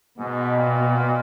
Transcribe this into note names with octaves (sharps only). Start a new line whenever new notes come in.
G#2 B2
A#2